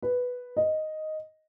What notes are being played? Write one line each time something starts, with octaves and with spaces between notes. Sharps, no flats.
B4
D#5